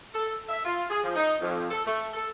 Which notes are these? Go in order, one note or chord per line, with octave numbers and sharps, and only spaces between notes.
A4
E5
F4
G#4
F3
D#4
F2
A4
A3
A4